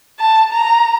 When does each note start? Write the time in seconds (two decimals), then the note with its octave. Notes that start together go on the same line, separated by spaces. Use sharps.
0.19 A5
0.52 A#5